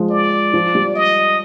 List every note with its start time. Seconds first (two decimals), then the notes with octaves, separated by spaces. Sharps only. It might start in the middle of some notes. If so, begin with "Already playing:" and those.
Already playing: F3 G#3
0.10 D5
0.53 F3
0.75 G3
0.95 D#5